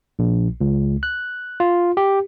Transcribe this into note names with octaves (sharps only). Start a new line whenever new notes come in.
A#1
C#2
F#6
F4
G4